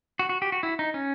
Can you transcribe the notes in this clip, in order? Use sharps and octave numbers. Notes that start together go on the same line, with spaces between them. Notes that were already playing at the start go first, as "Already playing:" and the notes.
F#4
F#4
G4
F#4
E4
D#4
C#4